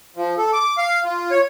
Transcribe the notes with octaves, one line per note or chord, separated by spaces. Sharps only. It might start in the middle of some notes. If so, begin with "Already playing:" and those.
F3
A4
D6
F5
F4
C#5